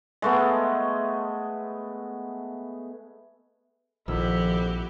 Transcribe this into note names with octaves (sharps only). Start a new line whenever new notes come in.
G#3 A3 B3
A#1 F2 D#3 F3 E4 F#4 G4 E6